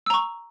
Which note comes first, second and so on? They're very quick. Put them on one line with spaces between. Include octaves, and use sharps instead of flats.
E6 A#5 C#6